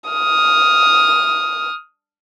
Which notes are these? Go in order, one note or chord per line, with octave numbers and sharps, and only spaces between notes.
D#6 F6